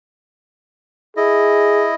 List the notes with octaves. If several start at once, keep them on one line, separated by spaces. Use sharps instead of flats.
E4 G#4 D#5